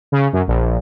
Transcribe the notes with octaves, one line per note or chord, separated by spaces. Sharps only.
C#3
F#2
A#1